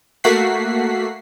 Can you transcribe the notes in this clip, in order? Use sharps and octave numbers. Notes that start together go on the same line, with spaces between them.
A3 A#3 F#4 F#5 B6 C7